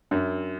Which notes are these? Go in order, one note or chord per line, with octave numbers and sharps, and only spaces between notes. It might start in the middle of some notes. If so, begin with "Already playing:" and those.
F#2 D4